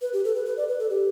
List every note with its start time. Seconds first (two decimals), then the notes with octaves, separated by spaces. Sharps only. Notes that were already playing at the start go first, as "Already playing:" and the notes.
0.02 B4
0.13 G4
0.24 A4
0.35 B4
0.46 B4
0.57 D5
0.68 B4
0.79 A4
0.90 G4